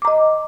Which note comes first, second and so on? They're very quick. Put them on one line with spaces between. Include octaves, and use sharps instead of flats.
D6 A#5 D#5